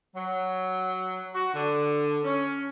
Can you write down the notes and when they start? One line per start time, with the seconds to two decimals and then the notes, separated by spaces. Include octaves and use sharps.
0.16 F#3
1.34 F#4
1.54 D3
2.24 C#4